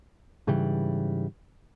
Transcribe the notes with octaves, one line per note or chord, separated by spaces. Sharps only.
G#2 C#3 E3 G3